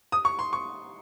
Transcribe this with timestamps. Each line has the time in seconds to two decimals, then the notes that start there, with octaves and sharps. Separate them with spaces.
0.12 D#6
0.25 C#6
0.39 C6
0.53 C#6